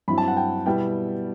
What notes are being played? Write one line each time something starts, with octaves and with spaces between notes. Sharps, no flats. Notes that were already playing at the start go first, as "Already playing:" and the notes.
G2 F#3 C4 E4 B5
A5
F#5
G5
B2 G3 B3 E4 G5